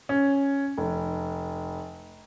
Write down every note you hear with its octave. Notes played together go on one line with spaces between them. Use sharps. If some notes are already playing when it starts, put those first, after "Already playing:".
C#4
F1